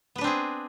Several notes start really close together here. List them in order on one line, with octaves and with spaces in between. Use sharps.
B3 B4 D4 C4 G#4